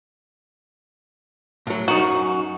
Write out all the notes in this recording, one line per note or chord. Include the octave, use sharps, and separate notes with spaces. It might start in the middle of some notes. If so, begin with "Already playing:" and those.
A2 F#3
F#2 D#4 F#4